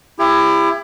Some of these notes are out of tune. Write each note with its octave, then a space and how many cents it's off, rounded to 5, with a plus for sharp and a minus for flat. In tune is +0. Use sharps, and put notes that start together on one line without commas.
E4 +20 G4 +35